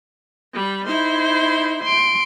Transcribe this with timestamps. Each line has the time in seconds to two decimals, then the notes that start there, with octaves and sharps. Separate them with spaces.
0.53 G3 B5
0.86 D#4 E4 C5
1.84 C6 D7